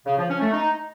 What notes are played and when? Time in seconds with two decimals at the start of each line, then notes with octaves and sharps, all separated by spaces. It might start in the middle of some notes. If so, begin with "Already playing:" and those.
0.06 C#3
0.17 F3
0.29 C#4
0.41 A3
0.52 D#4